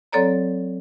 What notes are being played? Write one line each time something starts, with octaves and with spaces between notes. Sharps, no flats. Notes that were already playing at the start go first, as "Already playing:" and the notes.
F#3 C4 A4 C#5 D5 A#5